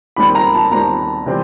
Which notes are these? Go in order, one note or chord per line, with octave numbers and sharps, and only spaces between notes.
D#2 D#3 G3 C4 B5
A#5
A5
D#2 D#3 G3 C4 A#5
C3 E3 G3 C4